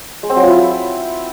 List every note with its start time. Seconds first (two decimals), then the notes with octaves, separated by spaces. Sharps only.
0.23 G#3
0.30 C4
0.36 F#3
0.43 F4
0.49 E4